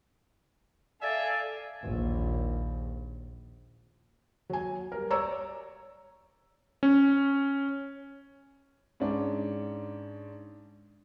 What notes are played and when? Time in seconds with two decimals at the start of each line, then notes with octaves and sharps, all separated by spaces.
1.02 A4 D5 E5 F5 G#5
1.84 A#1 D#2
4.50 F#3 G#5
4.92 G3 A#4
5.11 C#5 D5 A#5 E6
6.83 C#4
9.00 G#2 C#4 D4